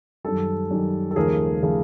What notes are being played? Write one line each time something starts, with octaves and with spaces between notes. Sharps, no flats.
F#2 D#3 G3 A4
F#2 D#3 G3
A4
D#2 C#3 F3 A3 G#4 A#4
C#3 F3 A3 G#4